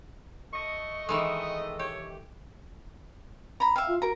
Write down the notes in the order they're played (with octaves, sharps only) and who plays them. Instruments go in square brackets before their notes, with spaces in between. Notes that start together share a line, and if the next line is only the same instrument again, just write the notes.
[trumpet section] A3 D#5 [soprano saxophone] C#6
[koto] D#3 E3 G#3 [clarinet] A4 [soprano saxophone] C#6
[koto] G4 [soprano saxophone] C#5
[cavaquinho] A#5 B5
[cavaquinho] E5 F5 [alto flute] G5
[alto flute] F4
[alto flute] F#4 [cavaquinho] A#4 A#5